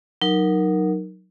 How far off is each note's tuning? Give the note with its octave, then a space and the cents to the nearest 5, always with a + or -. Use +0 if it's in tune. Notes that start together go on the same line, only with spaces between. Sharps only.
F#3 +0 D#4 -10 A#4 +0